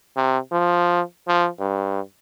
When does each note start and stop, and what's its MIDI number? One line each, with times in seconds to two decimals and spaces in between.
0.16 0.37 48
0.52 1.01 53
1.28 1.48 53
1.59 2.00 43